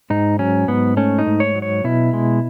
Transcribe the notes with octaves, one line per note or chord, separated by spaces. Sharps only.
G#2 D#4
F#3 C#4
G#2 B3
A3 C#4
D#4
G#2
C#5
F#3
C#5
B2 E4
G#3